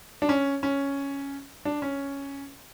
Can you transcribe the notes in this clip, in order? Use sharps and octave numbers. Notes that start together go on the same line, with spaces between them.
D4
C#4
C#4
D4
C#4